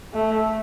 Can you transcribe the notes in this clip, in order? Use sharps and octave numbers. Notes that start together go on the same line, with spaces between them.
A3